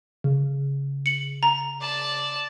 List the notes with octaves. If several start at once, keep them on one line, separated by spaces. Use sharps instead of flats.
C#3
C#7 F#7
A#5
D5 A5